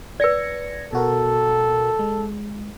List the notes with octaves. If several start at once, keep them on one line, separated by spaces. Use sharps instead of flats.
B4 D5 G#6 A#6 C#7
B2 F#4 A4 A#4
G#3